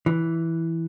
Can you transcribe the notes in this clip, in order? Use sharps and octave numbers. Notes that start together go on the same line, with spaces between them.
E3